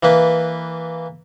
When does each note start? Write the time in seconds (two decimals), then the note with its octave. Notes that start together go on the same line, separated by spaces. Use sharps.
0.03 E3 A#3 B4